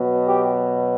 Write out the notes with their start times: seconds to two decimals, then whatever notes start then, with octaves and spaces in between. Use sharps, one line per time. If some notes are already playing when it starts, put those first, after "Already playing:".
Already playing: B2 F#3 B3
0.26 G4